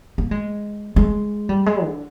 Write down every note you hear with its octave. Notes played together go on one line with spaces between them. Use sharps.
A#3
G#3
G#3
G3
G#3
D3